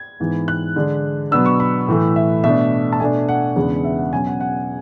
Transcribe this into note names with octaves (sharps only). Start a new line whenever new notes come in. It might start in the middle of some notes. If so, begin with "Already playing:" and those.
Already playing: G#6
G#2 E3 B3
F#6
D3 G#3 D4
B2 F#3 B3 D4 E6
C#6
B5
A2 E3 A3
E5
B2 A3 D4 E5
A5
B2 A3 D4 G#5
F#5
E2 C#3 G#3 B3 D4
E5
F#5
B2 F#3 C#4 G#5
F#5
F#5